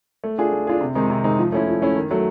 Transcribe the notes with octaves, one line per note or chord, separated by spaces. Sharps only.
A3
D4 F4 G#4
A3
D4 F4 G#4
C3
D#3 G#3 C4 D#4
C3
D#3 G#3 C4 D#4
F3
A3 C#4 E4
F3
A3 C#4 E4
D#3
F#3 A3